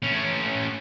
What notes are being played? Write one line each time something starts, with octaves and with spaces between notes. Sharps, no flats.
A2 C#4